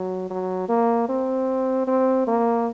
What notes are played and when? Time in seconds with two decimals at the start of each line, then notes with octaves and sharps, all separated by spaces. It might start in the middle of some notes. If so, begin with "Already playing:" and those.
Already playing: F#3
0.30 F#3
0.69 A#3
1.09 C4
1.87 C4
2.27 A#3